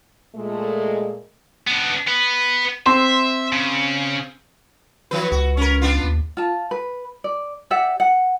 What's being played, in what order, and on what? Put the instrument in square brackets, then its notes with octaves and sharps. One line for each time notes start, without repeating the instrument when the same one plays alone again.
[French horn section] A#2 G#3 A3
[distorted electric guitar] B3 D4
B3
[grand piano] C4 C6 [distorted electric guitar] E5
[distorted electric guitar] C#3
[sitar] E3 F3 B4
[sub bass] C#2 [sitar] F#4
[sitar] C#4 A#4
B3 D4 F4
[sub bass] D#2
[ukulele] F4 A5
B4
D5
G4 D5 E5 F#5
F#5